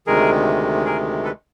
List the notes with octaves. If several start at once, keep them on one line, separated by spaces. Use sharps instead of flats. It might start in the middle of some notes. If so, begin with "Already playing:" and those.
D2 C3 D#3 G#3 G#4 A#4
G#4 A#4
A4 B4